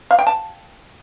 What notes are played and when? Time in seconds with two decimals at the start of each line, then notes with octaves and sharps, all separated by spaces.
0.11 F5
0.19 G5
0.27 A5